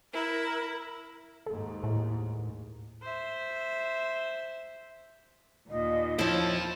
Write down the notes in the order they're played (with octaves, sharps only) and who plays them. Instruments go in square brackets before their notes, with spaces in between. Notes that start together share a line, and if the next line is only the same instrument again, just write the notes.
[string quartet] E4 [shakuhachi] A#4
[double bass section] D#2 G#2 [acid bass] A4
[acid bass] A2
[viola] C5 E5
[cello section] D#2 A#2 [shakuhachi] D#5
[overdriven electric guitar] F2 A4 [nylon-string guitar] F3 E4 [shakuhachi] C#5